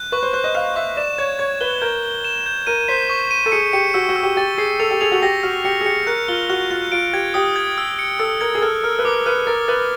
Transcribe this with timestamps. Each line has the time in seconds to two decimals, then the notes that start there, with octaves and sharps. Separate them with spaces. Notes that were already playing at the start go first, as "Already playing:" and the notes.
Already playing: F#6
0.12 B4 C#6
0.23 C5
0.33 C5 F#6
0.44 D#5
0.55 F5 F#6
0.76 E5 C#6
0.97 D5 E7
1.18 C#5 G#6
1.39 C#5 G#6
1.61 B4 G7
1.81 A#4 G6
2.03 G7
2.24 E7
2.46 G6
2.67 A#4 D#7
2.88 C5 B6
3.10 C#6
3.31 D#7
3.46 A4
3.52 G#4 C#7
3.73 G4 C#7
3.94 F#4 E6
4.09 F#4
4.16 E6
4.23 G4
4.37 G4 A6
4.58 G#4 C7
4.80 A4 F7
4.91 G4
5.01 G#4 F7
5.12 F#4
5.22 G4 A#6
5.43 F#4 F6
5.65 G4 C#7
5.81 G#4
5.86 G4 C#7
6.07 A#4 F#6
6.28 F4 G7
6.49 F#4 F#6
6.70 F4 F#6
6.92 F4 D7
7.13 G4 G#6
7.34 G4 D#6
7.56 G#6
7.78 E6
7.99 C#7
8.19 A4 E6
8.41 A#4 G#6
8.55 G#4
8.62 A4 F6
8.83 A#4 F6
8.99 B4
9.05 A#4 D6
9.26 B4 F6
9.47 A#4 A6
9.68 B4 A6